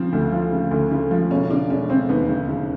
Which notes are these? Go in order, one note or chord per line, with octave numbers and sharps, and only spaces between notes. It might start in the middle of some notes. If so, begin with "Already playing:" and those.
Already playing: C#3 F3 C4
D2
F3
C#3
D2
C#3
F3
E1 C#4
C#3 D4
E1 C#4
C#3 C4
D#2 B3
C#3
C#3